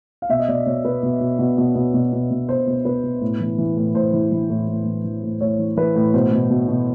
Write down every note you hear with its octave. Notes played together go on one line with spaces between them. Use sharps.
F5
B2 E5
D#5
B2 D5
B2 C#5
B2 B4
B2
B2
B2
B2
B2
B2
B2
B2
B2 C5
B2
B2 B4
B2
A2
E3
E3
A2
A2 C5
E3
E3
A2
A2
E3
E3
A2
A2 C#5
E3
E3 B4
A2
B2 C5
B2
B2
B2